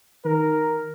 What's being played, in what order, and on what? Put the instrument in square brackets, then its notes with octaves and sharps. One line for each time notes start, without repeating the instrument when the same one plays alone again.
[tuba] D#3 [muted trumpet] A#4